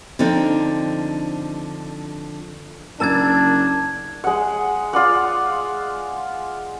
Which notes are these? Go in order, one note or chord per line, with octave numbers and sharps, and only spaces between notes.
D3 F3 C4 D4 D#4
F#1 D4 A#4 A5 E6 G#6 A6
G#3 F#5
F4 D5 F#5